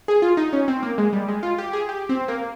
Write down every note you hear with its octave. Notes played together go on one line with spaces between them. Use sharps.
G#4
F4
D#4
C#4
C4
A#3
G#3
G3
G#3
F4
G4
G#4
G4
C4
A#3